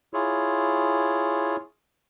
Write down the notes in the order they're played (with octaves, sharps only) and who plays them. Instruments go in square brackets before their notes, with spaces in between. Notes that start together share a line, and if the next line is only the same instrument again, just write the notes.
[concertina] E4 F4 G#4 C#5